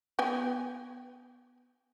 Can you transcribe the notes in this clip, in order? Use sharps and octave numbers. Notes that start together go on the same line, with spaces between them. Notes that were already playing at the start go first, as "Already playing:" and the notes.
B3 G5 G#5